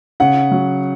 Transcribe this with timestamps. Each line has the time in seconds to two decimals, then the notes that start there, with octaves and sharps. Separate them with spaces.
0.20 C#3 F#5
0.51 F#3